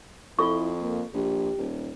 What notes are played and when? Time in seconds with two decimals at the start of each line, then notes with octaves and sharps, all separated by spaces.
0.39 F2 E4 F4 A4 C#6
0.81 A#3
1.14 A#1 G4
1.58 D#1